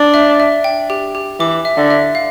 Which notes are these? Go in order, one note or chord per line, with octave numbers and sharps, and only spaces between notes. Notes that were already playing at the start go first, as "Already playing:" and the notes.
Already playing: D4
E5
E5
G5
G4
G4
E3 D6
E5
D3
E5
F5